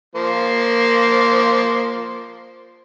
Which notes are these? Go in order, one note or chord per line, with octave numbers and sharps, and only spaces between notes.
F3 A#3 C5